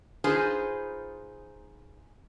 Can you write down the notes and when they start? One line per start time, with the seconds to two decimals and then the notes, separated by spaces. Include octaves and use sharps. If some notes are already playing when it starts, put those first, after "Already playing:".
0.24 D#4 F4 G#4 B4 C5 G#5